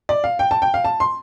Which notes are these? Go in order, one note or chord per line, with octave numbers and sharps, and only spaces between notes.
D5
F5
G5
A5
G5
F5
A5
C6